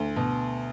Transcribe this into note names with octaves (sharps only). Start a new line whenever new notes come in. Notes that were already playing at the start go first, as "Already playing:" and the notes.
Already playing: D2
B2